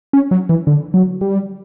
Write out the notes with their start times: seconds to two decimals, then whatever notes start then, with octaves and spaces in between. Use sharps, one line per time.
0.13 C#4
0.31 F#3
0.49 E3
0.67 D3
0.94 F#3
1.21 G3